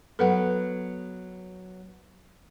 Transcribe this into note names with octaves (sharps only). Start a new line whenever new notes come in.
F#3 B3 A4 B4 F#5